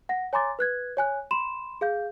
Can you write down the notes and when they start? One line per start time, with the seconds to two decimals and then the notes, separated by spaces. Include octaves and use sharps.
0.09 F#5 A#6
0.33 C#5 G#5 A#5 C6 D6 A6
0.59 B4 F#6 G#6
0.97 C#5 G#5 F#6
1.31 B5 C6 E7
1.81 G#4 F5 G6